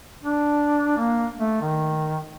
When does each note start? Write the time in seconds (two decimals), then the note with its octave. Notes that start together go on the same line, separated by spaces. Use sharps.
0.22 D4
0.97 A#3
1.39 A3
1.61 D#3